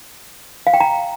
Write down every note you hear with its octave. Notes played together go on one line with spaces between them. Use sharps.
F5
G5
A#5